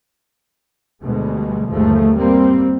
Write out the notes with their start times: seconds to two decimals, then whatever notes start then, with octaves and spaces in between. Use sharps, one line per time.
1.02 D2 B2 G3 G#3
1.71 G1 D#2 F3 G#3 A3
2.16 G3 A#3 C4